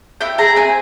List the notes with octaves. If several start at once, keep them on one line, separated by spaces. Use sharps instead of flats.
E4 G5
G#4 A#5
C4 G#5